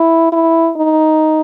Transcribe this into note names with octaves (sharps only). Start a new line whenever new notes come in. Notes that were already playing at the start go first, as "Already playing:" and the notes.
Already playing: E4
E4
D#4